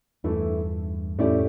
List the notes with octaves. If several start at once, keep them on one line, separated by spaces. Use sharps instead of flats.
E2 G2 E3 A3 E4
F2 A2 A3 C#4 E4 G4 D5